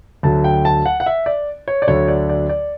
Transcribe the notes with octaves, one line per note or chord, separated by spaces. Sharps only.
D2 D3 F#3 A5
G5
A5
F#5
F#5
E5
D5
C#5
D5
D2 D3 F#3 C#5
D5
D5
D5